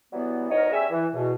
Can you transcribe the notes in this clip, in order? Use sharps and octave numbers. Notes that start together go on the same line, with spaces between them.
E3 F#3 G3 B3
D2 B2 D#4 A#4 C#5 D#5
G3 C#4 G#4 E5
E3
E2 B2